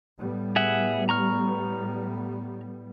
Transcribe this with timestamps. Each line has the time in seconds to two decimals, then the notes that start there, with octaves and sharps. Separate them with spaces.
0.18 A2 G3 B3
0.56 G#4 E5 F#5
1.09 A#5 C#6 F6